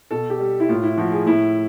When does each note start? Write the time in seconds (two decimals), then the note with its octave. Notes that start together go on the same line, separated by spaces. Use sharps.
0.11 B2 A4
0.30 G4
0.40 G3
0.60 E4
0.69 A2 F4
0.83 E4
0.97 F3 F#4
1.12 G#4
1.26 A2 E4